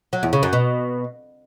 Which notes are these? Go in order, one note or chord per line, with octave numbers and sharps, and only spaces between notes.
F#3
E2
C#3
F#2
B2